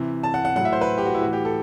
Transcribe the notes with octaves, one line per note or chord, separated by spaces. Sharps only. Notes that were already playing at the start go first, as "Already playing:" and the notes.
Already playing: C3 E3
A5
F#5
F#5
A2 F#3 F#5
E5
C5
B4
G4
F#4
E4
A2 E3 F#4
G4
A4